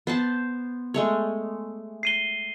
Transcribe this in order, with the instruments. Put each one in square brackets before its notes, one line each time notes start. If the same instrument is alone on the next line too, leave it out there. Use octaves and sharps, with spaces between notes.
[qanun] B3 C5 A5
G#3 A3 C#5
[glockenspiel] C7 D#7 G7